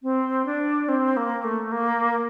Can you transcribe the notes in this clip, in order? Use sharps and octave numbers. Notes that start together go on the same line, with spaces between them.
C4
D4
C4
A#3
A3
A#3